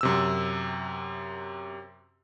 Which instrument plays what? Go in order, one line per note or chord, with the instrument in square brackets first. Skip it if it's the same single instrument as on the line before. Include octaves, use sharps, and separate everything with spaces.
[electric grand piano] F#2 C3 E6